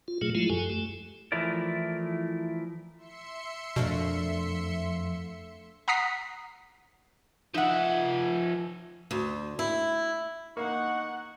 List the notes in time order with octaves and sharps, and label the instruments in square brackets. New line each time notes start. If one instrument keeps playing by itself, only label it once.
[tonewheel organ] F4
A#2 F#3 A3 G#4
F3 F#3 G#3 A3 E4 F4
F#2 G4 A4 G#5
A3
[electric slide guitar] E3 F3 A3 E4 A#4 D5
[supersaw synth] E5 C6 C#7
[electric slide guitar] F2 [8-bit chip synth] B2 [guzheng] A3 D4 A#4
[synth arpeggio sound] F#5 A#5 D#6 B6 C7
[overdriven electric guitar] F3 E5 [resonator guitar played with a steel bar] D#4 F#5
[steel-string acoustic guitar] D2
E4
[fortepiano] A#3 [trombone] D#4 [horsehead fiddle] F#5 [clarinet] C#6